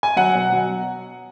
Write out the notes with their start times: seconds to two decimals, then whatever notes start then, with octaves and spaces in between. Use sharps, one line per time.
0.03 G#5
0.16 F#3 F#5
0.34 B2
0.52 F#3